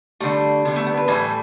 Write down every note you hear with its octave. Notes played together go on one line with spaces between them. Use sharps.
D3 G3 A3
D3 G3 B3
A3
B3
B4
A2 E3 G3 A4